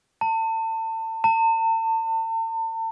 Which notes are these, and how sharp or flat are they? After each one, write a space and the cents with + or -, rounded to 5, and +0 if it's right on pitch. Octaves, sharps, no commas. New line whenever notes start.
A5 +30
A5 +40